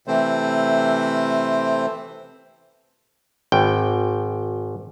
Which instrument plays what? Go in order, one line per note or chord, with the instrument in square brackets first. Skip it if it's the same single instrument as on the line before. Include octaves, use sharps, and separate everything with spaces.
[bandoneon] C3 E3 A3 C4 C5
[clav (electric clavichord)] G#1 G5